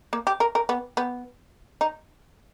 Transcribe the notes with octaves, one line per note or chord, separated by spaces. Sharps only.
A#3
G4
A#4
A#4
B3
B3
D#4